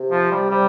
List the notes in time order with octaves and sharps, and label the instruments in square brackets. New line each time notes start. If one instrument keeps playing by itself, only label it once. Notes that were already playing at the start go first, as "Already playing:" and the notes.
Already playing: [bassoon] C3
[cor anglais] F3
G3
[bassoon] C3 [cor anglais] G3